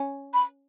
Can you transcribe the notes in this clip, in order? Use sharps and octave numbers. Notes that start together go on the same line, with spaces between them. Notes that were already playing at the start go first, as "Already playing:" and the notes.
Already playing: C#4
B5